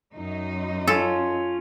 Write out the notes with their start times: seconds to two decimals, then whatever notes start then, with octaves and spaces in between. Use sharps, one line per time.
0.14 F#2 D#4
0.88 C#4 F4 A4